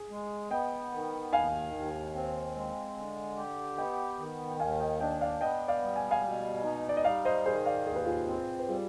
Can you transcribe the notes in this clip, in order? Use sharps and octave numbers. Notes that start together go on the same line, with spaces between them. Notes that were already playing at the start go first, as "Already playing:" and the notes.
Already playing: G#4
G#3
B3 D#5 G5
D#3
D#2 F5 G#5
D#2
C4
G#3
D3
G4
B3 D#5 G5
D#3
G5
D#2 F5 G#5
D#5 G5
D4 D#5 G5
D5 F5
B3 D#5 G5
D5 F5
G3
G#5
F5 G#5
B2
D#4
D5
D#5
G3 D5 F5
C5 D#5
D#3 G#4 C5
D5 F5
D#2 G#4
B4
F4 G#4
C4
B4
G3 F4 G#4